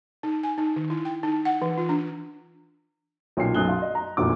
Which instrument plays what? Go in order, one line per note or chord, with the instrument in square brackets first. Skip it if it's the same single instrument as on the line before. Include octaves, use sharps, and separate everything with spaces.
[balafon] D#4
G#5
D#4
D#3
E4
G5
D#4
F#5
E3
F4
D4
[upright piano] B1 A#2 C#4 G5 C7
B1 F#2 D#6 F#6 G7
F5 C6
D#5
A#5
F1 A#1 A#2 D#3 F#4 D6